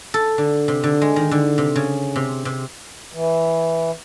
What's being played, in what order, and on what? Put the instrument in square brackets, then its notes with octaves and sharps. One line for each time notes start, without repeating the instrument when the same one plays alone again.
[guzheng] A4
D3
C3
D3
G#3
D#3
D3
C3
C#3
C3
C3
[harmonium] E3